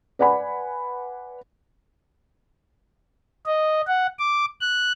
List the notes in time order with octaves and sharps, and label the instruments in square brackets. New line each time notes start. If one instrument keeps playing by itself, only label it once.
[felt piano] B4 D5 F#5 G#5 B5
[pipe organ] D#5
F#5
D6
F#6